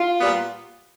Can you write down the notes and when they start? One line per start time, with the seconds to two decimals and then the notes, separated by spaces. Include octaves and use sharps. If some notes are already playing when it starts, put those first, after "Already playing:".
Already playing: F4
0.19 A#2 G3 B3